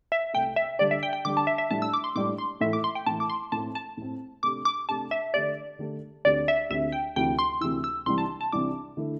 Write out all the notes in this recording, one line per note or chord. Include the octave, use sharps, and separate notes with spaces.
E5
C2 C3 A3 G5
E5
D3 G3 D4 G4 D5
E5
G5
G5
D3 G3 D4 G4 D6
A5
E5
E5
A2 G3 D4 A5
E6
D6
C6
A2 G3 D4 D6
C6
A2 E3 A3 E4 E5
D6
C6
G5
A2 E3 A3 E4 A5
D6
C6
A2 A3 C4 A5
A5
A2 A3 C4
C3 A3 D4 G4 D6
D6
C3 A3 D4 G4 A5
E5
D3 A3 D4 G4 D5
D3 A3 D4 G4
D2 D3 C4 G4 D5
E5
D2 D3 C4 G4 E5
G5
D2 C3 E3 G5
C6
D2 C3 E3 E6
E6
C2 C3 E3 G3 D4 C6
A5
A5
C2 C3 E3 G3 D4 D6
D3 A3 E4